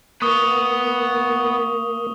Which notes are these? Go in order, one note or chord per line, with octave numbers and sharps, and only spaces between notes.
A#3 B3 B4 C#6 D#6 G7